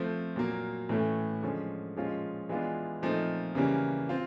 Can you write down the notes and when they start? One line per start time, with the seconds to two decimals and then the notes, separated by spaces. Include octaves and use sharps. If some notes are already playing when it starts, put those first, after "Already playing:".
Already playing: F3 A3 C4
0.36 A#2 F#3 A#3
0.89 A2 E3 A3 C#4
1.43 D3 F3 G#3 C#4
1.96 A#2 F3 G#3 C#4 F4
2.49 E3 G#3 B3 D4 F4
3.02 A#2 F3 A3 C4 D#4
3.55 C#3 E3 G3 A#3 C#4
4.09 C4 F4